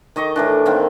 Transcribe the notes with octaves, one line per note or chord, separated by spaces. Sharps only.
D#3 D#5 C#6 D6
A2 E3 D4
D#3 A#3 C4